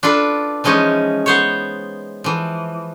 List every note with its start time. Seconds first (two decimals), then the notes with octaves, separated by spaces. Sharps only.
0.03 D4 F4 A4 B4
0.64 E3 F3 G#3 C#4 D#4
1.26 B3 C5 C#5
2.24 E3 F3